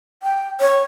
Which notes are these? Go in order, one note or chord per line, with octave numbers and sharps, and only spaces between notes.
G5
C#5